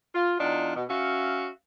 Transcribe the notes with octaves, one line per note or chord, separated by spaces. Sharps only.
F4
E2 D4 D#4 F4
B2
C#4 F#4 E5 F5